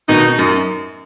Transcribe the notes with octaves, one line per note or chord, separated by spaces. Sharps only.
B2 D#3 D#4
F#2